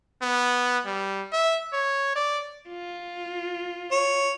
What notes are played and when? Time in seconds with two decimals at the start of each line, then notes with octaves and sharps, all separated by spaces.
0.22 B3
0.86 G3
1.32 E5
1.73 C#5
2.15 D5
2.69 F4
3.92 C#5